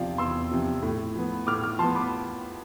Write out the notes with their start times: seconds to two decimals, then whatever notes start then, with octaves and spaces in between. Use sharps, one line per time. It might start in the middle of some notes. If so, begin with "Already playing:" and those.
Already playing: E2 C3 F3 D5 F5
0.18 E2 C6 E6
0.51 C3 F3
0.83 A2
1.15 F3 B3
1.47 A2 D6 F6
1.63 D6 F6
1.79 F3 B3 A5 C6
1.95 B5 D6